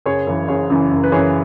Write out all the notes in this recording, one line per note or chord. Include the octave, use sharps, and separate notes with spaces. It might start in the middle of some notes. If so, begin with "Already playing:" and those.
F#1 G#4 C#5
F#2 C#3 E3
F#1 G#4 C#5
F#2 C#3 E3
F#1
B4
F#2 C#3 E3 G#4 C#5